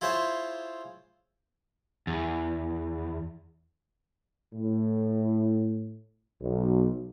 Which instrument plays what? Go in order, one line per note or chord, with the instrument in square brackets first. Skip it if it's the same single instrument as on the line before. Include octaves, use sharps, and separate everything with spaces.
[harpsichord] E4 F4 G#4 C5 C#5 E5
[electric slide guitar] E2
[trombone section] A2
B1